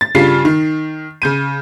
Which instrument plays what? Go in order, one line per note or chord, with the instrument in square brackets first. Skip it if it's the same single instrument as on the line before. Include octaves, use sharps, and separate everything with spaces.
[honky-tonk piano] A6
G2 C#3 G3 F4 B6 C7
D#3
C#3 G6 D#7